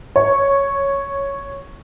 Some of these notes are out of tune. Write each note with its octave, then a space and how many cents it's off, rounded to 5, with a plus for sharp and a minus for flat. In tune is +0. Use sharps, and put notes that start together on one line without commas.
C#5 -5